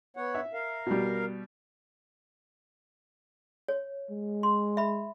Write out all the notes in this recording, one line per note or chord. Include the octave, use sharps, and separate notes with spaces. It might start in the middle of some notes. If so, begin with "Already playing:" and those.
B3 C#5 F#5
E5
A#4 F5
B2 G3
C#5
G#3
C6
E5 B5